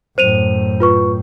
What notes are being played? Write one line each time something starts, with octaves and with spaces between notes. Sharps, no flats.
F#2 A2 C5 D#7 F7
F4 B4 C#6